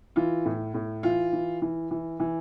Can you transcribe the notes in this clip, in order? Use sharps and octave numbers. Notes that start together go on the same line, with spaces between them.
E3 F4
A2
A2
E3 F4
E3
E3
E3
E3